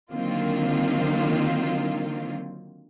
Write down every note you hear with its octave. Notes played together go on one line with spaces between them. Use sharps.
D3 D#3 F#3 A#3 C4 F4